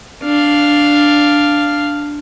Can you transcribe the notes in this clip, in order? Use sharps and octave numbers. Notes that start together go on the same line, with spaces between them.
D4 F5